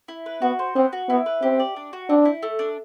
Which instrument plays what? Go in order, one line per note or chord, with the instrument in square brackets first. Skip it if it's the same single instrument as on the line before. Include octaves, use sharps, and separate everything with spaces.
[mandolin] E4
B4
[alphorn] B3 [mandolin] F#4
[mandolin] C5
[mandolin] B3 [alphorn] C4
[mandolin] F#4
[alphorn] B3 [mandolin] E4
[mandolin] B4
[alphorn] C4 [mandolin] G4
[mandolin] D5
D4
F#4
[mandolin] C4 [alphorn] D4
[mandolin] E4
A3
D4